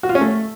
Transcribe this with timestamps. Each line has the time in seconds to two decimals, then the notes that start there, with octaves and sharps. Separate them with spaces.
0.03 F#4
0.09 F4
0.15 C#4
0.21 A3